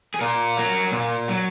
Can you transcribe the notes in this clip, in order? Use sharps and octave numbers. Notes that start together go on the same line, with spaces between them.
G#4
A#2 A#4
F#3
A#2
F#3